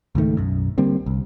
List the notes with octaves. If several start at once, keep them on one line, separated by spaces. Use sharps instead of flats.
C#2 G#2 D#3 A3
B1 F#2
D3 G3 A#3 C4
C2